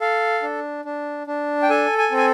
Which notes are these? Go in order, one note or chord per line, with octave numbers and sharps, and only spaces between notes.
A4 F5
D4
D4
D4
G5
A4 G#5
G#5
C4
G#5